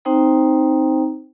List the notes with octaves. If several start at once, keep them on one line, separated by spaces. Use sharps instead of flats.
C4 D#4 C5 G5 A#5